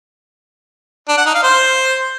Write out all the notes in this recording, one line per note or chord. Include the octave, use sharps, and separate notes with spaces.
D4
F#5
D#4
F5
C5